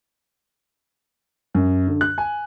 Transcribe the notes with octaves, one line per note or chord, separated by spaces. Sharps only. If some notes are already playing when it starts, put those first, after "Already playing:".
F#2
D3
F#6
G#5